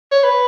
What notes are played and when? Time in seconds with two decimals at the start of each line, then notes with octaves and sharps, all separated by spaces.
0.12 C#5
0.24 B4